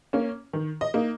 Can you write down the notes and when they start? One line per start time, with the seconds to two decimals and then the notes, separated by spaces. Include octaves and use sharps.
0.13 A#3 C#4
0.53 D#3
0.81 D#5
0.94 A#3 D#4